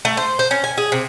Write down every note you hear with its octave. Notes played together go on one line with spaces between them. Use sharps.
A3
C5
C5
C#4
G#5
G#4
C3